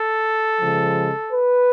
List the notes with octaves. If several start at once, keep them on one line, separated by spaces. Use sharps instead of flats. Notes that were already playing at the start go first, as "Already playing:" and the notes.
Already playing: A4
C#3 F3 G#3
B4